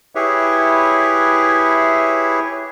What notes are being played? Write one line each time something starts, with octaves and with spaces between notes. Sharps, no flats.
E4 G4 G#4 B4 C#5 E5